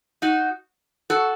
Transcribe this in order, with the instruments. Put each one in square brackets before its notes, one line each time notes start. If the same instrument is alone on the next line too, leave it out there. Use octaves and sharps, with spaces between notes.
[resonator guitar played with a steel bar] D#4 F#4
F#4 A4